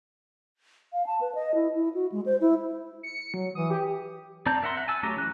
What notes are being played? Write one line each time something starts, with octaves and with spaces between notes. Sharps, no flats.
F5
A5
B4
D#5
E4
E4
F#4
G#3
C5
E4
C#7
F#3
E3 D#6
G4
C4 D5 A5 A#5 G6
A#4 E5 F#5 A#5 C6
E5 F#5
G#5 A5 E6
F#3 A3 C#4 G4 A#5
E3 F#6